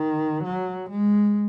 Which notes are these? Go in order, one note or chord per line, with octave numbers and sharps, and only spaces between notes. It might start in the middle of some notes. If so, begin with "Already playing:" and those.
Already playing: D#3
F#3
G#3